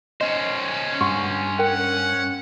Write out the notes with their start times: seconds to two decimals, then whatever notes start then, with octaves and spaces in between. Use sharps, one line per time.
0.21 C#4 C5 D#5
1.01 G2 F#5 C6 C#6
1.59 A#4 F#5 G5